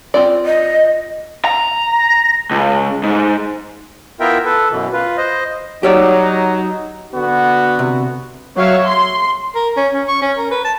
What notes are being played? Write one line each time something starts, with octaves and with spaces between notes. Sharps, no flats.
C4 F4 D5
D#5
A#5
C#2
G#2
B3 E4 F4 A#4 E5 G5
A4 B4
F#2 B2 E3
F4 B4
C5 D#5
F#3 D#4 G4 C#5 D5
D3 B3 F#4
C3
F#3 C#5 E5 F5
C6
A#4
C#4
C#4
C#6
C#4
A#4
B4
A5